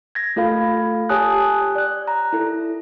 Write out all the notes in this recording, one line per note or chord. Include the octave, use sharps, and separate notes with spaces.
G#6 A#6
A3 F4 A4 F5 B5
G4 C#5 G#5 A5 D#6 F#6
D5 F#6
A#5
E4 A4